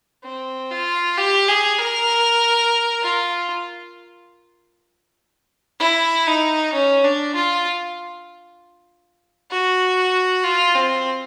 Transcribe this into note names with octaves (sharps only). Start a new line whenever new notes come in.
C4
F4
G4
G#4
A#4
F4
E4
D#4
C#4
D4
F4
F#4
F4
C4